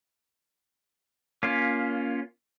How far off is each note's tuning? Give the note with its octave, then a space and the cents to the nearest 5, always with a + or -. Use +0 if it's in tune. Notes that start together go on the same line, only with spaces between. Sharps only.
A#3 +15 C#4 +15 F4 +0